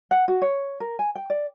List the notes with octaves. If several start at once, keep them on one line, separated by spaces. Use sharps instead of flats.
F#5
F#4
C#5
A#4
G#5
G5
D5